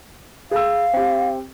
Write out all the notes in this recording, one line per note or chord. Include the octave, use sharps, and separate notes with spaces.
G#4 F5 E6
C4 G4